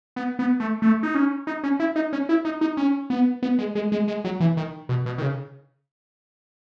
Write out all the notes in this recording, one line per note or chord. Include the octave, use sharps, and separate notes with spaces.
B3
B3
A3
A3
D#4
C#4
D#4
C#4
E4
D#4
C#4
E4
D#4
D#4
C#4
B3
B3
G#3
G#3
G#3
G#3
F#3
E3
D#3
B2
B2
D#3
C#3